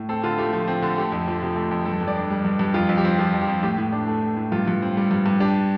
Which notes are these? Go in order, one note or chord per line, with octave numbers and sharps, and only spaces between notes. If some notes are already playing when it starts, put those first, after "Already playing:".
Already playing: A2
C4 A4
D3 F4
A3 G4
F3
C4
D3
A3 G4
F2
F3
C3
A3
F2
G2 A4
G2
D5
D4
G3
G2
G2
F2 F4
F2
G4
C4
F3 F4
F2
G4
F2
A2 G4
A2
D4
A3
A2
A2
G2 F4
G2
C4
G3
G2
G2
D4 G4